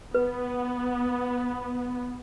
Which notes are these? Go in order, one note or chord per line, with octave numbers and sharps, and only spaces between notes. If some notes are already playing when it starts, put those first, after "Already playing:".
B3 B4